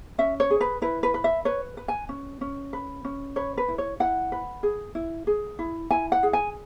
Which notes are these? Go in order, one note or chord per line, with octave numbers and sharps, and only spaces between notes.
C#4 E5
C#5
G#4
B4
E4 B4
B4
B4
E5
B4 C#5
B4
G#5
C#4
C#4
B4
C#4
B4 C#5
B4
E4
C#5
E4 F#5
B4
G#4
E4
G#4
E4
E4 G#5
F#5
G#4
G#5